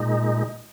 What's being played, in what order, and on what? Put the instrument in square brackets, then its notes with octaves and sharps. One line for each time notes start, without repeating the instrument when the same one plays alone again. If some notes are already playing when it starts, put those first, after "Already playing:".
Already playing: [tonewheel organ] A#2 G#3 D#4